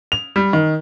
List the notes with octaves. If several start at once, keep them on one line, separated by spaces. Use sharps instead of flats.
F7
G3
D#3